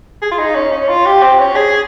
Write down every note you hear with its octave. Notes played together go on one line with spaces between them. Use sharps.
G#4
F4
D#4
C#4
C#4
F4
G4
C4
C#4
G#4